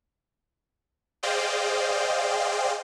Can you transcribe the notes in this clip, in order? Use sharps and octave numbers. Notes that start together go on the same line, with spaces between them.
G#4 C5 D5 D#5 F5 G5